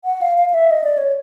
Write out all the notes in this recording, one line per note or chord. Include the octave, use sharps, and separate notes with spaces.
F#5
F5
F5
F5
E5
D#5
D5
C#5